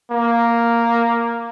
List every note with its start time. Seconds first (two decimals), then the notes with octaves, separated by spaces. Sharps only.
0.11 A#3